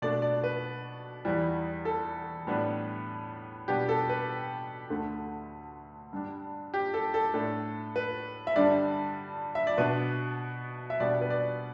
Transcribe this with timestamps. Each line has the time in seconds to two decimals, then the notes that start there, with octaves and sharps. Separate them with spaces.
0.02 B2 A3 D4 D5
0.22 D5
0.44 B4
1.25 E2 E3 G3
1.85 A4
2.47 A2 G3 B3 D4
3.68 B2 G3 B3 D4 G4
3.89 A4
4.09 B4
4.90 D2 D3 A3
6.13 G2 G3 D4
6.74 G4
6.94 A4
7.14 A4
7.34 A2 A3 D4
7.96 B4
8.47 E5
8.56 G2 D3 G3 D4 D5
9.55 E5
9.67 D5
9.78 B2 B3 D4 B4
10.90 E5
11.00 B2 G3 B3 D4 D5
11.21 B4
11.30 D5